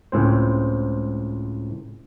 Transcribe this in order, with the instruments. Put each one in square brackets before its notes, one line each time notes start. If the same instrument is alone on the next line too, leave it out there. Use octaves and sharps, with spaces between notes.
[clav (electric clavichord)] C#2 A2 C4 C5